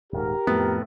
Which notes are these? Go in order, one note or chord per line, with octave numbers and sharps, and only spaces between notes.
D#1 G#2 G4 A#4
F2 A2 B3